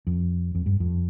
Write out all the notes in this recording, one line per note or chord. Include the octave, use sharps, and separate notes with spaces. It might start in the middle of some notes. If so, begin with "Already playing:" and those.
F2
F2
G2
F2